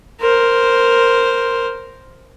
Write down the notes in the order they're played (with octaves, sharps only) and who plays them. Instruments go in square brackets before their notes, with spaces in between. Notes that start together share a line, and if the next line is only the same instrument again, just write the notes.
[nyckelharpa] A#4 C5